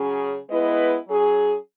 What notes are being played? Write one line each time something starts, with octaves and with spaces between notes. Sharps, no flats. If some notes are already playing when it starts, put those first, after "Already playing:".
Already playing: C#3 F#3 C#4 G#4
G#3 B3 E4 B4 D#5
F#3 C#4 G#4